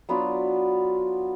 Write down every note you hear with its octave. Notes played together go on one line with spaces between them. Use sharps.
F#3 B3 D4 F4